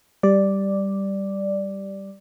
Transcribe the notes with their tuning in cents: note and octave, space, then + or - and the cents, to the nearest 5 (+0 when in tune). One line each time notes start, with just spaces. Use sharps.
G3 +0 D5 +0